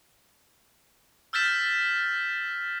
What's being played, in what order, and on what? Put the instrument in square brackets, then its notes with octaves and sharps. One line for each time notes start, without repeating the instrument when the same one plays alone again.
[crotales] E6 F6 G6 A6 B6 E7